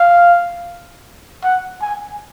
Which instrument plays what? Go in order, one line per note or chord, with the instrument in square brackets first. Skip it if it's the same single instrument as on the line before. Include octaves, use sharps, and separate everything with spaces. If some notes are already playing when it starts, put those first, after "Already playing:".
Already playing: [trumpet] F5
F#5
G#5